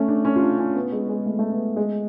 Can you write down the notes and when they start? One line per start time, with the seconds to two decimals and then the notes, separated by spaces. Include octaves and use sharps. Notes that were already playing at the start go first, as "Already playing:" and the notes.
Already playing: A3 C#4
0.08 D4
0.25 C#4
0.36 F4
0.42 D4
0.59 C#4
0.75 B3
0.92 G#3
1.09 G#3
1.26 A3
1.39 A3
1.52 B3
1.76 G#3